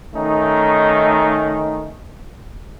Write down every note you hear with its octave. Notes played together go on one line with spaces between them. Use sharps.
D#3 A3 C#4 D#4